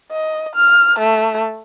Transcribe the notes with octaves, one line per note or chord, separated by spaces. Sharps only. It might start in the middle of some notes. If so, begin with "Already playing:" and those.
D#5
F6
A3